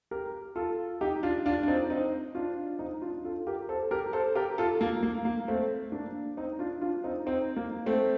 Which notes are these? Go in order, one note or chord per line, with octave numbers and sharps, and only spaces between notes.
G4 A#4
F4 A4
D#4 G4
D4 F4
D4 F4
D4
C4 D#4
C4 D#4
D4 F4
C4 D#4
D4 F4
F4 A4
G4 A#4
A4 C5
G4 A#4
A4 C5
G4 A#4
F4 A4
A#3
A#3
A#3
A3 C4
A#3 D4
C4 D#4
D4 F4
D4 F4
C4 D#4
C4 D#4
A#3
A3 C4